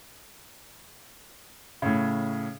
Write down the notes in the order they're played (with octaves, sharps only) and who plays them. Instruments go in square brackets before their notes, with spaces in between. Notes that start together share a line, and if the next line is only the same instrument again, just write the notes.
[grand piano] A2 C#3